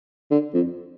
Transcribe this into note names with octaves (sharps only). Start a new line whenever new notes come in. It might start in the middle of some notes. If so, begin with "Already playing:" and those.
D3
F2